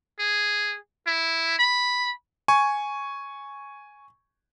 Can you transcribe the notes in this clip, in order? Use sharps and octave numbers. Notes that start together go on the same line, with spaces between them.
G#4
E4
B5
G#5 C#6